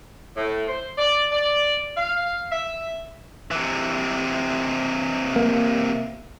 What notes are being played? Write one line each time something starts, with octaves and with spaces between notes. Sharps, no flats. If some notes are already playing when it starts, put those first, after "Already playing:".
A2
C5
D5
D5
F5
E5
C3 E3
A#3